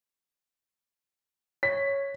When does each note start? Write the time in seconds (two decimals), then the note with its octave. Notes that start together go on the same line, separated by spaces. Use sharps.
1.63 C#5 B6